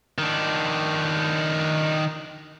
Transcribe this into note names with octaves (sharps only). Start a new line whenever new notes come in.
D#3 D4